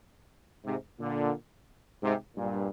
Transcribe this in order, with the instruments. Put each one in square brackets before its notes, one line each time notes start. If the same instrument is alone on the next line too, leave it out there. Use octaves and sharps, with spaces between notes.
[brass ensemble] G#2 C3
A#2 D3
G#2 C3
G2 A#2